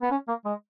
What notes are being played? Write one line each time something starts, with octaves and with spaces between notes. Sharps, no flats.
B3
C#4
A#3
G#3